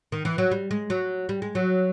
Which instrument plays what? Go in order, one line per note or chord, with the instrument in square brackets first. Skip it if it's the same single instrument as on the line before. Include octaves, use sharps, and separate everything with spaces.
[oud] D#3
E3
F#3
G3
G#3
F#3
G3
G#3
F#3